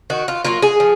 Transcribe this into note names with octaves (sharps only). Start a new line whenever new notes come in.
D#3 F#4
F4
F#3 A#3 F4
G#4
F3